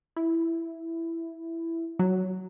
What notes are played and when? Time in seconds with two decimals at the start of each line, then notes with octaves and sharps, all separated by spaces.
0.16 E4
1.99 F#3